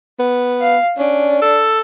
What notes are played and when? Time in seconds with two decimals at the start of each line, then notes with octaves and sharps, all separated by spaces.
0.19 B3
0.61 F5
0.98 C#4 D4
1.42 A4